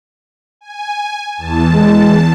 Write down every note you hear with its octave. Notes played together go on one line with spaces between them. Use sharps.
G#5
E2 A5
G#3